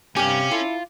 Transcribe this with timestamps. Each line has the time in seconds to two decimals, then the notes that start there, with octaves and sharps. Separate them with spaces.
0.16 G2 C3 C#4 G4 F5 G#5
0.51 E4 F4 A4